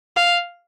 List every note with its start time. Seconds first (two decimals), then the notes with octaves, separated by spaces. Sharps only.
0.16 F5